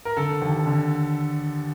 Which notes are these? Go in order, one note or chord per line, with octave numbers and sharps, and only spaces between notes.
A#4
D3 A4
D#2
D3